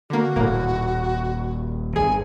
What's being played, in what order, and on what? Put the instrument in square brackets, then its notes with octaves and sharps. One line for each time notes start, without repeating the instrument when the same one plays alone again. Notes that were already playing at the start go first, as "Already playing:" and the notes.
[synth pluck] D3 A#3 [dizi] F#4
[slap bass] D#1 D#2 [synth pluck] A2 A#3
[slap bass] G1 [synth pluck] G#4 [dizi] G#5